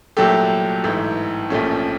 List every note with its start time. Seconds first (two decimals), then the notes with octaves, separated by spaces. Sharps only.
0.17 C2 A#2 F#3 A3 G4 A4
0.84 A1 G#2 E3 A3
1.50 A#1 A#2 F3 A3 C#4